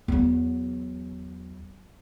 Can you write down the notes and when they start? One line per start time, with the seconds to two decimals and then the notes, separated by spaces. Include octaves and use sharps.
0.08 E2 F#3